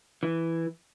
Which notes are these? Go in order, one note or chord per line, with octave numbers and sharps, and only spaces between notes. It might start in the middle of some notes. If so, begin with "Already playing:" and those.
E3